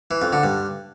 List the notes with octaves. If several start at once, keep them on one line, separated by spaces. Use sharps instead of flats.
E3
F2
D3
G2